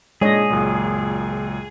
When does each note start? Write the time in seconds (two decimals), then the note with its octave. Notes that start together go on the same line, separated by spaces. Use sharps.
0.21 A#2 G#3 D4 G#4 C#5 D#5
0.50 C#2 F#2 A#2